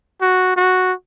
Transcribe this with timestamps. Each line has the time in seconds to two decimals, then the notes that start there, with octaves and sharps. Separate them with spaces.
0.21 F#4
0.56 F#4